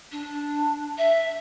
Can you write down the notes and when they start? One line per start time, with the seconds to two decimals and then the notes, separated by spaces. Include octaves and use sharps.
0.11 D4
0.98 E5